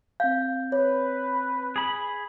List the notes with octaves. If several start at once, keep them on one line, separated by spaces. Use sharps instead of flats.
C4 F5 G6
B4 C#5
G#4 B5